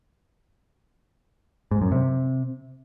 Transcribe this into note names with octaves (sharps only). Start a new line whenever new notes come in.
G#2
F#2
C3